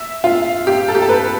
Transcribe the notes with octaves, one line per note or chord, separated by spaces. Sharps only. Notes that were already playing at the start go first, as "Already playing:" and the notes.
Already playing: E5
F4
G4
A4
G4
A4
B4